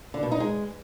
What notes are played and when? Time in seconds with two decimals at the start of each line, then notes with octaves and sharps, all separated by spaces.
0.14 D3
0.23 B2
0.31 D#4
0.40 G#3